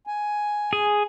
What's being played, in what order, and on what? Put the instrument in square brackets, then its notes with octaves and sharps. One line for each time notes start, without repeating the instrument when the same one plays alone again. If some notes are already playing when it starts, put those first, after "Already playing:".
[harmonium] G#5
[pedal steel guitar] G#4